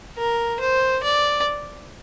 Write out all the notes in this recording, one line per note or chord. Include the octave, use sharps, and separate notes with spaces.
A#4
C5
D5